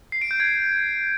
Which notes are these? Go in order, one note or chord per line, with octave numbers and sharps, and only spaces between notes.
C7
D7
G6
G#6